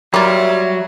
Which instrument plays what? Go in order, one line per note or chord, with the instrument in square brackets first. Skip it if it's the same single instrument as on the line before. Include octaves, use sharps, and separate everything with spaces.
[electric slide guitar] F#3 [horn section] G3 [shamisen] A#3 F4 [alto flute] E5